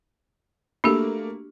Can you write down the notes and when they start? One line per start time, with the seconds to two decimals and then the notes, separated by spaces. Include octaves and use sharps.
0.84 A3 A#3 D4 F#4 G4